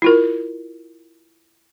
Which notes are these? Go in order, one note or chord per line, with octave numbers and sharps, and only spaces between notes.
E4 F4 A#4